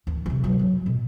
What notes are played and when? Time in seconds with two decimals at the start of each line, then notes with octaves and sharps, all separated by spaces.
0.07 D#2 E3
0.26 C3 E3
0.44 F3 F#3
0.59 F#3
0.86 B2